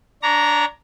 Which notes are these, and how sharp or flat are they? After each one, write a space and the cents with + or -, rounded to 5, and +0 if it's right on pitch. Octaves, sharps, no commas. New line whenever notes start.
D4 -5 C#5 +30 A#5 +0